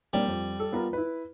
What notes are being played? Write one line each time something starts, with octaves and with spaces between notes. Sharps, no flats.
G3 A#3 C4 D4
F2
A4
B3 F4 A#4
E4 B4